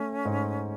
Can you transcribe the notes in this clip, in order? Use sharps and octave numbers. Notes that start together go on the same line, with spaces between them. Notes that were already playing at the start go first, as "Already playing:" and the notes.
Already playing: A3 C#4
G#2